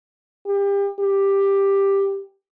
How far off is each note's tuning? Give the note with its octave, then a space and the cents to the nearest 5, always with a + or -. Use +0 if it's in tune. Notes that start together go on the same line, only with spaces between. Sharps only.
G4 +30
G4 +10